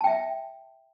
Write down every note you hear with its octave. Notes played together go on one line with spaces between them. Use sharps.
E5 G5 A5